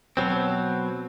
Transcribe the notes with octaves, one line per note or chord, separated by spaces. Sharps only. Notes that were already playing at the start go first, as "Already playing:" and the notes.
B2 F#3 C4